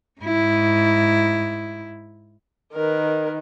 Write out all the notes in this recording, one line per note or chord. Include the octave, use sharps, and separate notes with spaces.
G#2 E4
D#3 A#4 B4